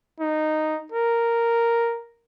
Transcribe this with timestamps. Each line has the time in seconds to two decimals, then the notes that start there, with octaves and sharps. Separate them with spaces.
0.20 D#4
0.92 A#4